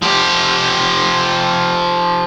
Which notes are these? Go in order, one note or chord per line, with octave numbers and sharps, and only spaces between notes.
F3 G4